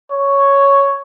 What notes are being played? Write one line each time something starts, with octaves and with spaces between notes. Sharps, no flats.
C#5